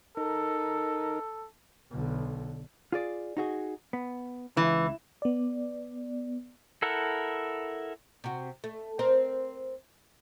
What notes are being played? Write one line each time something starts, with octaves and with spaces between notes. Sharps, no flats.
D#4 A4 A#4
B1 D3
F4 G#4 D5
D#4 F#4 G#4
B3
C#2 E3 E4
B3 D5
E4 A4 A#4 F#5
C3 F#4
A3
C4 A#4 C5